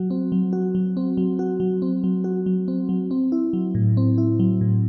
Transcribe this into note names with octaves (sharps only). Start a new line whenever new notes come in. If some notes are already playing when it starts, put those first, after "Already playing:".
Already playing: F#3 F#4
C4
F#3
F#4
F#3
C4
F#3
F#4
F#3
C4
F#3
F#4
F#3
C4
F#3
C4
E4
F#3
A2
C4
E4
F#3
A2